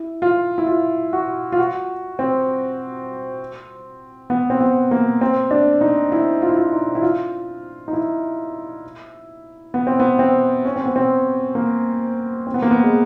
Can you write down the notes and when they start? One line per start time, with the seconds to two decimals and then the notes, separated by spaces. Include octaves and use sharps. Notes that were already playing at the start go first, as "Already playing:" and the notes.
Already playing: E4
0.22 F4
0.58 E4
0.67 F4
1.13 F#4
1.52 F4
1.59 F#4
2.19 C4
4.30 B3
4.50 C4
4.61 B3
4.91 A#3
5.21 C4
5.51 D4
5.81 D#4
6.12 E4
6.42 F4
6.49 E4
6.57 F4
6.73 D#4
6.95 E4
7.02 F4
7.88 D#4
7.93 E4
9.74 B3
9.87 C4
10.00 B3
10.19 C4
10.65 C#4
10.76 C4
10.86 B3
10.96 C4
11.55 A#3
12.47 C4
12.54 B3
12.62 A#3
12.71 B3
12.83 G#3